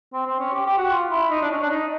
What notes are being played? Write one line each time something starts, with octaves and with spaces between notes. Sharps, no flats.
C4
C4
C#4
G4
G4
F#4
F4
E4
D#4
D4
C#4
D4
D#4